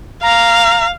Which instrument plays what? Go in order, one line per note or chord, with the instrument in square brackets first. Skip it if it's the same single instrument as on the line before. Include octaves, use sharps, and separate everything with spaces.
[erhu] F5 [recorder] A#5